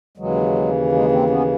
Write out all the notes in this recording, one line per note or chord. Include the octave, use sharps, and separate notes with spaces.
D#2 C#3 E3 F#3 G#3
G#3 A#3
A#3 C4
B3 C#4